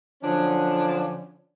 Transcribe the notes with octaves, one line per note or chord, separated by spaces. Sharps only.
D3 F3 F#3 C#4 D4